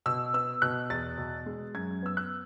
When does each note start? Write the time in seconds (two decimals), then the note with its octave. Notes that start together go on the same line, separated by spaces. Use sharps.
0.06 B2 E6
0.34 B3 E6
0.62 B2 F#6
0.90 E2 A6
1.18 B2
1.46 G#3
1.75 F#2 G#6
2.02 B3 E6
2.17 F#6